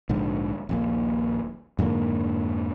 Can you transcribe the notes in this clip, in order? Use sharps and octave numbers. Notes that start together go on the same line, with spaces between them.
A#1 G#2 D3
D#1 A#1 A#3
F2 G#2 D3 A#3